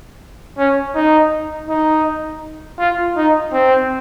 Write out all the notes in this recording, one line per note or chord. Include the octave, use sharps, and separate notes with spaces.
C#4
D#4
D#4
F4
D#4
C4